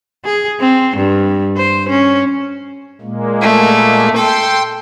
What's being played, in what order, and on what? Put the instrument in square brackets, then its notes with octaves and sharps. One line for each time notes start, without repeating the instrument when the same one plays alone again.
[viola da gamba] G#4
C4
G2
C5
C#4
[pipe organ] A#2 G#3 A#3
[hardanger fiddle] A3
[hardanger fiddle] A4 [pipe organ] G5 C6